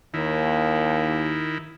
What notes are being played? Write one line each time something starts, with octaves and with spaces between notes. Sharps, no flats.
D#2 D#3 E4